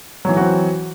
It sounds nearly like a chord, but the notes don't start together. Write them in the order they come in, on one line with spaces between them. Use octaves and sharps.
F#3 E3 E4 F#4 C4